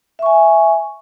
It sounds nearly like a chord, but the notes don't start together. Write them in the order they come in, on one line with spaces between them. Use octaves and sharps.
E5 C#6 G#5